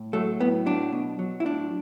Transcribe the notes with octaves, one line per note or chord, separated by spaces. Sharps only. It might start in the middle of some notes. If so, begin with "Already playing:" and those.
Already playing: A2
F#3 A3
A2 B3
F#3 D4
B2
F#3
E4
A2 D4